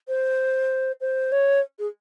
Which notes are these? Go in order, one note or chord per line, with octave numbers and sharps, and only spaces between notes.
C5
C5
C#5
G#4